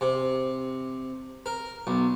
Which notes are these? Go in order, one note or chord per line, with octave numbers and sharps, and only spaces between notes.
C3
A#4
B1